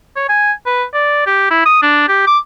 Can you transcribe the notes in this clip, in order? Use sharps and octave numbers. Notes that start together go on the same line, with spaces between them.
C#5
G#5
B4
D5
G4
E4
D#6
D4
G4
D6